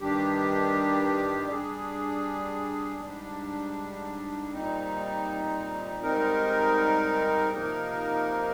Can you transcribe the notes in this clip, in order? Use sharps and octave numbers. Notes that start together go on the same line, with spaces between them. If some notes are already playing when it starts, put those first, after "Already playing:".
G2 D#3 G3 D4 G4
G3 D4 G#4
G#2 G3 D4
A#2 G3 C4 D#4
G#2 G3 C4 D#4 A#4
C3 F3 A#3 D#4 A#4